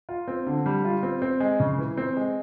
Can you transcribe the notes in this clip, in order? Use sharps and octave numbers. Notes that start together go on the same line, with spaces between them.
F4
C4
D3
G3
F4
C4
C4
G#3
C#3
E3
C4
G#3